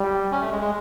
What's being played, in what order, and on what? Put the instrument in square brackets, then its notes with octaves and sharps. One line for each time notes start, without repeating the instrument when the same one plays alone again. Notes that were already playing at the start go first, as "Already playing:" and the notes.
Already playing: [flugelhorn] G3
[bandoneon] C#4
A3
G#3
G#3